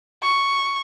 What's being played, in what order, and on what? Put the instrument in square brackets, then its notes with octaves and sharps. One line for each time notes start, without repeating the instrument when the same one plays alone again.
[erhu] C#6